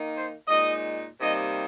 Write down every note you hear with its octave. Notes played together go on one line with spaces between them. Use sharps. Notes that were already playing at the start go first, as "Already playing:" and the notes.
Already playing: D#3 A#3 D#4
C5
A#2 G#3 D#4 D#5
C3 G3 A#3 D#4 D#5